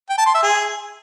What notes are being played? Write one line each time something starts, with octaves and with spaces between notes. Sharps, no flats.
G5
A5
C6
E5
G#4